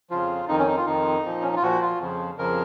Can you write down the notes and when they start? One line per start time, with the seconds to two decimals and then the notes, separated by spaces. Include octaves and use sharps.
0.10 F2 C#3 F3 F4
0.48 F2 D#3 D#4
0.59 C#4
0.67 D#4
0.77 F4
0.86 F2 D#3 D#4
1.25 A#2 F3
1.41 C#4
1.48 D#4
1.56 F4
1.62 A#2 F3 F#4
1.82 F4
2.00 F2 C#3 F3
2.38 F2 C#3 F3 A#4